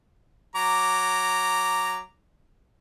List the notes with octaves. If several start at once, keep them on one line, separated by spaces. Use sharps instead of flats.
F#3 A#5 D6